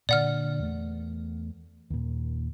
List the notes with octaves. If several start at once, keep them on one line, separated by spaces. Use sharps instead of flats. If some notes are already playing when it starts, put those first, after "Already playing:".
A#2 D3 D5 F#5 F6
E2 A3
D#2 A#2